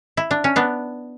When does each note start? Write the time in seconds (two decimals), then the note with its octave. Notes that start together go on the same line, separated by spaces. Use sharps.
0.17 E4
0.31 D4
0.44 C#4
0.56 B3 D4